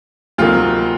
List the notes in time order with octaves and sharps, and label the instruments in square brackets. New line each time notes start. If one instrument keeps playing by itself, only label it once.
[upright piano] D2 C3 D#3 F#3 A#3 F4